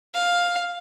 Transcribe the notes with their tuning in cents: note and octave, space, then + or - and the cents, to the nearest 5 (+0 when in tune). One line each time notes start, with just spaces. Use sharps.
F5 +10